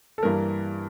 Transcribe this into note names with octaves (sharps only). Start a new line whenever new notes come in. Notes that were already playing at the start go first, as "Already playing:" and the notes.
A4
G2 E3 G3 A#3 A#4